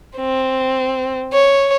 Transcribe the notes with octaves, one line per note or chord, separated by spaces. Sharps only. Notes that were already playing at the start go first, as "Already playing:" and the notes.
C4
C#5